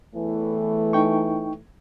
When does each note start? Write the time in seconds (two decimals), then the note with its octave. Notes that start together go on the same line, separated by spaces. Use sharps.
0.15 E2 A2 E3 A3
0.93 D#4 G5 C#6